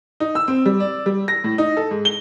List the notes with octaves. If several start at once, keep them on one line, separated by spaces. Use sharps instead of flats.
D#4
E6
C4
G3
D5
G3
A#6
A2
D#4
A4
G#2
G7